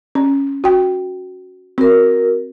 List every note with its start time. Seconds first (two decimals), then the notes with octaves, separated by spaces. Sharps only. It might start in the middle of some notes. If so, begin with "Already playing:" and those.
0.15 C#4
0.64 F#4 G5
1.78 C4 F#4 A#4